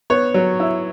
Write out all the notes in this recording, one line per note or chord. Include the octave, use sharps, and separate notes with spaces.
B3 C#5
F#3
E4